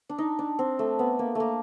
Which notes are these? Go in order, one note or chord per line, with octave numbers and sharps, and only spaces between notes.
D4
D#4
D4
C4
A3
B3
A#3
A3 A#3